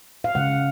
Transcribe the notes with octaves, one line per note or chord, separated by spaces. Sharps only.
F5
C#3 G#3 F#5